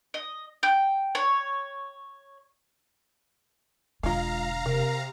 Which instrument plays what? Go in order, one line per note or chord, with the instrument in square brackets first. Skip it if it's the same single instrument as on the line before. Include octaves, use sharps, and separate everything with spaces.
[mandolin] D#5
G5
C#5
[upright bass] E1 D3 [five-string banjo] G#3 F4 [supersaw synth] F5 A#5
[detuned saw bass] C3 [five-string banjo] A#4